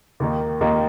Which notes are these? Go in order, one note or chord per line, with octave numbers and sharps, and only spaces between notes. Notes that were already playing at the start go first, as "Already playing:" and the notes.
D#2 D#3 A#3 D#4
D#2 D#3 A#3 D#4